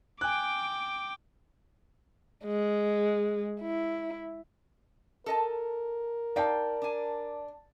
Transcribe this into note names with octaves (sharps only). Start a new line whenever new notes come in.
G5 G#5 D6 F#6
G#3
E4
A4 A#4 D#5 A5
D#4 D5 F5 G5 A5
D4 G#5